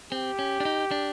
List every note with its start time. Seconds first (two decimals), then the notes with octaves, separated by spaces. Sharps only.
0.12 C4 G4
0.39 C#4
0.60 D4
0.65 D#4
0.91 D4